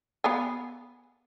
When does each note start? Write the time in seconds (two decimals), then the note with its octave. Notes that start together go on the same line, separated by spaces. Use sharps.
0.24 B3 F5 G#5